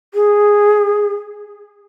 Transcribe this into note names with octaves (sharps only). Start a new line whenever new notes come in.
G#4